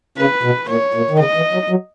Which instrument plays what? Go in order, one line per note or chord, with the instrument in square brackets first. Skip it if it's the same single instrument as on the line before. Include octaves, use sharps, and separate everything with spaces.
[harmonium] C#3 [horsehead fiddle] B4
[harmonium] B2
[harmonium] A#2 [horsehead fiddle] C#5
[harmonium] A#2
D#3
[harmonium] C#3 [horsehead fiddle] D#5
[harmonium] E3
F#3
F#3